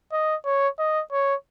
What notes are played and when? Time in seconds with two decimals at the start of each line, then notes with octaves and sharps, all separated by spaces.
0.13 D#5
0.45 C#5
0.79 D#5
1.12 C#5